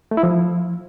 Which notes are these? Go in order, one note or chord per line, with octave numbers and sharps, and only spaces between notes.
A3
E4
F3